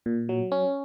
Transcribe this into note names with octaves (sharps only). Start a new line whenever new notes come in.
A#2
F#3
C#4